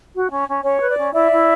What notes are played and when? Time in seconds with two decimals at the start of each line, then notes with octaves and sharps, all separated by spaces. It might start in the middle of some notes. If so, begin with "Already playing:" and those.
0.14 F#4
0.31 C#4
0.48 C#4
0.64 C#4 C#5
0.80 B4
0.89 D5
0.97 C#4
1.13 E4 D5 E5
1.30 E4